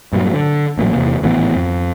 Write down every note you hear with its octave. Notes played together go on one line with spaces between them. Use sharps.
G2 A#2 F#3
D3
A1 A#2 C#3 F#3
E2 C3 A#3
G#1 A2 E3 B3
F2